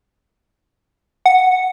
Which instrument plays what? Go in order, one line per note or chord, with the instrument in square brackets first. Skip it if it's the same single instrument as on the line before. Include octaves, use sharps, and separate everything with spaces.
[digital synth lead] F#5